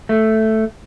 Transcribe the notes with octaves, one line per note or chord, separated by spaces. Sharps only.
A3